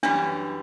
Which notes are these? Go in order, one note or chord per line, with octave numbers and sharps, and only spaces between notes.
F#2 E3 G3 C#4 D4